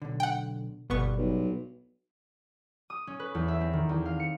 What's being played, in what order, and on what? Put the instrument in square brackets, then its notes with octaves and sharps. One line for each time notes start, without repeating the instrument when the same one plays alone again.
[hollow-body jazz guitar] B1 D3
[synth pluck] F#5 G5
[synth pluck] G1 B3 C#6 [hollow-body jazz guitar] B2 G3
[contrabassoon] B1
[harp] D#6
C#4
B4
E2
E5
C4
D#3
E2
F5
C#7